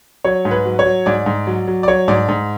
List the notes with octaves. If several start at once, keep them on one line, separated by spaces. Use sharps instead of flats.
F#3 C#5
G#2
B4
F#3
C#5
F#3
G#2 D5
G#2
F#3
F#3
D5
F#3 C#5
G#2 D5
G#2